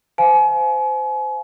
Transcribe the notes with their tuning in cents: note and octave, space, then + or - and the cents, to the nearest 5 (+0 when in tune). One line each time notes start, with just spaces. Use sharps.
C5 -25 F5 +0 G#5 +40